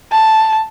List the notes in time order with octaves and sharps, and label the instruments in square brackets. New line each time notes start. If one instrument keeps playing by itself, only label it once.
[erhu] A5